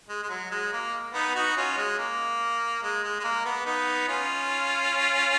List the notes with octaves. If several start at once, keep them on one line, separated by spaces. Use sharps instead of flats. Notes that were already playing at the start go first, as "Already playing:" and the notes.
G#3
G#3
F#3
G#3
A#3
B3 D#4
D#4 F#4
C#4 F4
G#3
A#3
G#3
G#3
G#3
A#3
B3
B3 D#4
C#4 F4